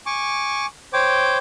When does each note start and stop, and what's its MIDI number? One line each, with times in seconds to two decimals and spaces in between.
0.06 0.66 80
0.06 0.66 85
0.06 0.66 86
0.93 1.38 72
0.93 1.38 73
0.93 1.38 79
0.93 1.38 86